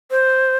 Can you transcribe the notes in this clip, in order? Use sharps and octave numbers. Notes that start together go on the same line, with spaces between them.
C5